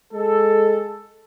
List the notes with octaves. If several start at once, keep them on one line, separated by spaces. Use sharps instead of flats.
G#3 A4